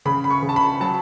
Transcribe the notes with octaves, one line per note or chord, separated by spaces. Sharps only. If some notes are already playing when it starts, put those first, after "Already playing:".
C#3 B5
B5
C#6
C#3
A5
B5
F#3 A5